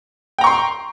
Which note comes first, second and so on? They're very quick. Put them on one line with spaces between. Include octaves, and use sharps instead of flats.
G5 A#5 C#6 C6